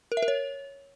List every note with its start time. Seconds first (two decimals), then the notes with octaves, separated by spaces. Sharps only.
0.12 A#4
0.17 E5
0.22 A#4
0.28 C#5